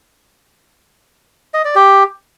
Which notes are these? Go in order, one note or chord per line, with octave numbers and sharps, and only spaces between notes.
D#5
D5
G4